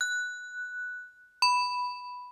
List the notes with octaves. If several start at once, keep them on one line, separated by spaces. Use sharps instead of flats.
F#6
B5